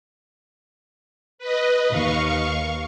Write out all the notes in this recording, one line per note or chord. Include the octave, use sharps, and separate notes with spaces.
B4 D#5
D#2 F5 C#6